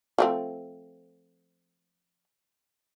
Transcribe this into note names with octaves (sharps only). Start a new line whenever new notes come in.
F3 A3 C4